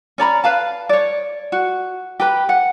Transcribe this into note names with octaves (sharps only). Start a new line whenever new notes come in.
C#4 D5 A#5 B5
B4 F5 A5
C#5 D5
F#4
G4 B4 B5
F#5